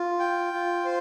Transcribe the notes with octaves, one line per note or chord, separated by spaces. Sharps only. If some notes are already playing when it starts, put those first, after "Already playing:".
Already playing: F4
G5
F4
C5